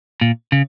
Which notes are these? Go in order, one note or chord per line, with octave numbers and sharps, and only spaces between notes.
A#2
C#3